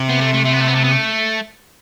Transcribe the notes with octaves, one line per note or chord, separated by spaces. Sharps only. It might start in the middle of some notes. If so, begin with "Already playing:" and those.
Already playing: C3
B3
A3
A3
A3
B3
A3
B3
A3
B3
A3